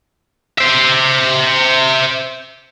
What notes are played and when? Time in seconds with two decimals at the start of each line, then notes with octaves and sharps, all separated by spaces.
0.58 C5 E5